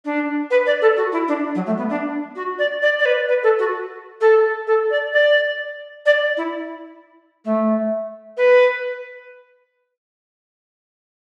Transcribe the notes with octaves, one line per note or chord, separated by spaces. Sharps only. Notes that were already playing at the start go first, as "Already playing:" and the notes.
D4
B4
D5
A4
F#4
E4
D4
F#3
A3
B3
D4
F#4
D5
D5
D5
B4
B4
A4
F#4
A4
A4
D5
D5
D5
E4
A3
B4